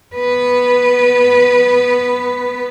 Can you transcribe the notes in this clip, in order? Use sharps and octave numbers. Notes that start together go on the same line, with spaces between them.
B3 B4